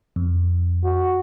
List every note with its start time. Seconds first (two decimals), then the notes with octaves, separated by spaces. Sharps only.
0.16 F2
0.84 F#4